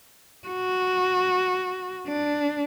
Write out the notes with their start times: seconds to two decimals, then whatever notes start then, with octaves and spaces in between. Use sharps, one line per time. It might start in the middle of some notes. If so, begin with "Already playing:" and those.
0.48 F#4
2.08 D4